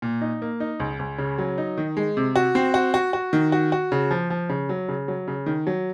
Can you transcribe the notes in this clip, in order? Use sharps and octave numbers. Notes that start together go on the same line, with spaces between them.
A#2
D#4
A#3
D#4
C#2
C#2
C#3
F#3
D#4
D#3
G#3
C3
F#4
C4
F#4
F#4
F#4
D#3
F#4
F#4
C#3
F3
F3
C#3
F#3
C#3
F#3
C#3
D#3
F#3